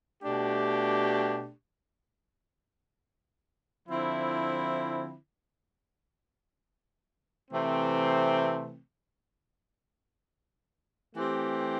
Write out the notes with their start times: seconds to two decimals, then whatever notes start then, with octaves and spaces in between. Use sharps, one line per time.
0.23 B2 A3 D4 G4
3.87 D3 F3 C4 E4
7.51 C3 E3 A3 C4
11.15 E3 A3 C4 G4